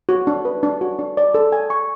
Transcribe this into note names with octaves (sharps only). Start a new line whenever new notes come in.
F#4
D4
B4
D4
F#4
D4
D5
A4
G#5
C#6